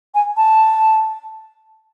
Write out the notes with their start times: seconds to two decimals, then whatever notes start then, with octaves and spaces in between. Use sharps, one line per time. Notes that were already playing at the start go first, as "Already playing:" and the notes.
0.14 G#5
0.37 A5